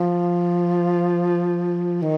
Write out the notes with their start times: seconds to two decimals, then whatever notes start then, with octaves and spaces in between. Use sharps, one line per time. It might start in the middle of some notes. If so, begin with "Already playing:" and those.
Already playing: F3
2.02 D#3